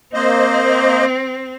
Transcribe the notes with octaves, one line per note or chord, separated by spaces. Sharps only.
A#3 C4 C5 D#5